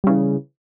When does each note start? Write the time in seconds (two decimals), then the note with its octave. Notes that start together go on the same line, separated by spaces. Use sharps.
0.04 G3
0.07 C#3
0.10 E3